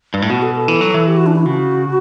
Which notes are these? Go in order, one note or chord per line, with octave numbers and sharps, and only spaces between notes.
G2
A2
B2 F#4
A4
A4
E3
F#3
E3
G4
F#4
D4
E4
C#3 F#4